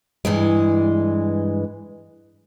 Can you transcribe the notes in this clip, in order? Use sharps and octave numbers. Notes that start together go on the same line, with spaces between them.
G2 E3 G#3